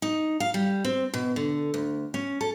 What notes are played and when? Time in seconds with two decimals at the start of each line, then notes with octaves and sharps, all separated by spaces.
0.02 D#4
0.40 F5
0.54 G3
0.85 C4
1.14 B2
1.36 D3
1.74 D2
2.14 C#4
2.41 A4